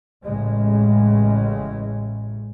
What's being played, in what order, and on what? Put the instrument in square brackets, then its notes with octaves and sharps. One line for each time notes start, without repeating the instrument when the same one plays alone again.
[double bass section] A1 A2 C#3 G#3